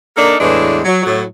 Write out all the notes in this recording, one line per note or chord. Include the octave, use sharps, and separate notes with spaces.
A#3 D4 D#4 A4 A#4
E2 A2 E3 G#3 D4
F#3
A2 F#3